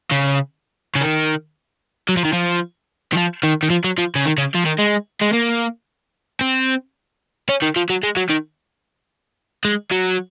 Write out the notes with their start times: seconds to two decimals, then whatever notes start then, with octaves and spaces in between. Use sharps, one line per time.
0.12 C#3
0.95 C#3
1.01 D#3
2.09 F#3
2.17 F3
2.25 D#3
2.33 F3
3.13 D#3
3.17 F3
3.43 D#3
3.63 D#3
3.70 F3
3.84 F#3
3.98 F3
4.15 C#3
4.25 D#3
4.38 C#3
4.55 F3
4.66 D#3
4.79 G#3
5.22 G#3
5.33 A#3
6.41 C4
7.49 C#4
7.62 D#3
7.76 F3
7.90 F#3
8.03 G#3
8.17 F#3
8.30 D#3
9.65 G#3
9.91 F#3